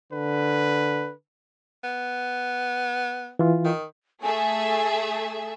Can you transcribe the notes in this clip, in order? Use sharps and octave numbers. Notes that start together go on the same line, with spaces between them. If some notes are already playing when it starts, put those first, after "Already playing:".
D3 B4
B3
E3 F4
D#3
A3 G#4 E5 G#5